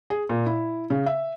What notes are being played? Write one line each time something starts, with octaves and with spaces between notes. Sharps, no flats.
G#4
A#2
E4
C#3
E5